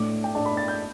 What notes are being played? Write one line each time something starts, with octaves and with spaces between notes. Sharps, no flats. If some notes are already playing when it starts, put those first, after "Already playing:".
Already playing: A2 A3 D4 D6
G5
A2 A3 D4 A5
B5
A6
G6